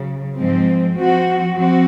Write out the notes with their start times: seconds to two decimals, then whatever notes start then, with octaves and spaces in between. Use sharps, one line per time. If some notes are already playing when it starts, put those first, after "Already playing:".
Already playing: C#3 F#3
0.37 G#2 F3 G#3 C4
0.96 F3 C4 F#4
1.55 F3 C4 F#4